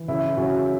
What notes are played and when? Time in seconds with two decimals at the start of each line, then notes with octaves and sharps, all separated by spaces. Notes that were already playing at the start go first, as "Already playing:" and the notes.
Already playing: E3
0.08 C#3 E4
0.37 C#3 F#4